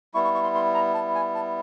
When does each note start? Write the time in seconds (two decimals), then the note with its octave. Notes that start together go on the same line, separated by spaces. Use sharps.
0.14 G3 B3 E4 C#6
0.25 C#6
0.35 C#6
0.44 C6
0.55 C6
0.74 A#5
0.94 A5
1.15 G#5
1.35 A5